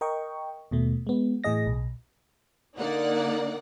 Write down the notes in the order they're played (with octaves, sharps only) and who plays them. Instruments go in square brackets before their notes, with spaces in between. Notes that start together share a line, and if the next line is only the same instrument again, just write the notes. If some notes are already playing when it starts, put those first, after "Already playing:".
[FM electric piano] A#4 D#5 G5 C#6
D#2 B2 A3
G#3 B3
A2 E3 G#4 D#5 A#6
B1
[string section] D3 A#3 D#4 D5 F#5